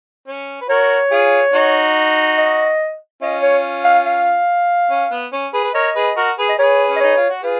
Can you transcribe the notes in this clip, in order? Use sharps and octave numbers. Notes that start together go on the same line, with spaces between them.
C#4
B4
F#4 A#4 C#5
F4 G#4
D#4 F#4
D#5
C#4 F4 D#5
C#5
F5
F5
C#4
B3
C#4
G#4 B4
B4
A#4 C#5 D#5
G#4 B4
F#4 A#4
G#4 B4
D#5
G#4 B4 C#5
C#4
D#5
D#4 C#5
F4
F#4
F4 G#4 B4